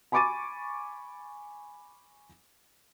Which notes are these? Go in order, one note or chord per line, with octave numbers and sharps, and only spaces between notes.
G#5 B5 C#6 D6 A6 D#7